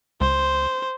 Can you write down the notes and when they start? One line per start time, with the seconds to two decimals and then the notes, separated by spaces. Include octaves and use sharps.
0.21 C#2 C5